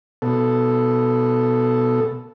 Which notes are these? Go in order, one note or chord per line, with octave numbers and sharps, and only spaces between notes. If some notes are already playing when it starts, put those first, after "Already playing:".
B2 A4